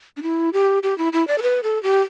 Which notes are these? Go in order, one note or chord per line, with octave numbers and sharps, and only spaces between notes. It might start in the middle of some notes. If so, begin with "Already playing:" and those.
D4
E4
G4
G4
E4
E4
D5
A4
B4
A4
G4